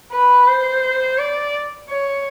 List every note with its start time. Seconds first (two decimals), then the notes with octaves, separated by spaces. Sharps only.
0.12 B4
0.47 C5
1.18 D5
1.89 C#5